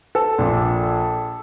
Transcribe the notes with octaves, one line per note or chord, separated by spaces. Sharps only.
A4
A#1 A#2